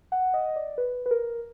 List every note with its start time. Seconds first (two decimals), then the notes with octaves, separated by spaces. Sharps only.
0.12 F#5
0.34 D#5
0.56 D5
0.78 B4
1.06 B4
1.11 A#4